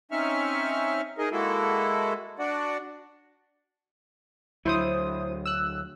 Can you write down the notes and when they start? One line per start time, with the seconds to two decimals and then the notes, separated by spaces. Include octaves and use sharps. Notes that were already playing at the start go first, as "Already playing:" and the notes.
0.11 C4 C#4 D#4 E5 C#6 F6
1.18 D#4 G#4 A#4 D#5
1.32 G#3 A#3 E4 F#4 A4
2.39 D4 F#4 D5 F#5
4.65 D2 F#3 E4 C5 D#6
5.46 E6 F#6